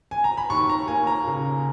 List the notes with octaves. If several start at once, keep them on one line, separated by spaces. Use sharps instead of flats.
G#5
A#5
B5
D#2 C#6
A#5
A#3 G#5
A#5
C#3